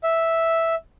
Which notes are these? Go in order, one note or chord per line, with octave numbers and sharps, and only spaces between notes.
E5